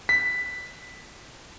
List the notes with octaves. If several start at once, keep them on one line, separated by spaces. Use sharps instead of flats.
B6